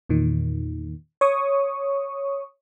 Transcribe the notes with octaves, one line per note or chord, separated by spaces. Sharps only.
E2 A#2 D#3
C#5 C#6 D#6